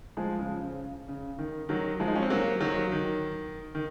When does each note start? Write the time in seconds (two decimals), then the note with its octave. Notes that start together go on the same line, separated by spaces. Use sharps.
0.17 F3 G#3
0.39 C#3 F3
0.63 C#3
1.08 C#3
1.39 D#3
1.69 D#3 F#3
2.00 F3 G#3
2.07 D#4
2.15 C#4
2.23 C4
2.30 F#3 A#3
2.60 D#3 F#3
2.92 D#3
3.75 D#3